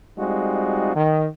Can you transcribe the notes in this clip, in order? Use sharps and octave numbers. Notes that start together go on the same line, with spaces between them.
G3 G#3 C4 D#4 F4 F#4
D#3